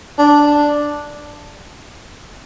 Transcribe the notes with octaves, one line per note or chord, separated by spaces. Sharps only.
D4